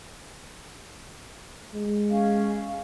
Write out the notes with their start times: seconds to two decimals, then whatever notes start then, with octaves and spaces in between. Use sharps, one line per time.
1.74 G#3
2.10 C#4 F5